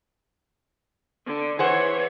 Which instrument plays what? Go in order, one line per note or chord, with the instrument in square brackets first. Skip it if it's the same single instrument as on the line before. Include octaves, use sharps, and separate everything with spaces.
[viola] D3
[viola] E3 C#5 [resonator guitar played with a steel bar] G#4 C5 F#5